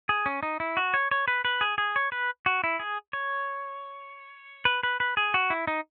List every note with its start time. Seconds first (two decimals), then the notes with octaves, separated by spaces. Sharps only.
0.09 G#4
0.26 C#4
0.43 D#4
0.60 E4
0.77 F#4
0.94 C#5
1.11 C#5
1.28 B4
1.45 B4
1.61 G#4
1.78 G#4
1.96 C#5
2.12 B4
2.46 F#4
2.64 E4
2.80 G#4
3.13 C#5
4.65 B4
4.83 B4
5.00 B4
5.17 G#4
5.34 F#4
5.50 E4
5.67 D#4